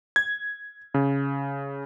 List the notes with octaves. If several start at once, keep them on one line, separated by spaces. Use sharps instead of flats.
G#6
C#3